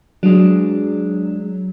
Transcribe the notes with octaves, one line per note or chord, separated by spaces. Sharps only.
F#3 G#3 D4